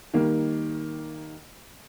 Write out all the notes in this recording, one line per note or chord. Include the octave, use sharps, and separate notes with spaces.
D#3 G3 A#3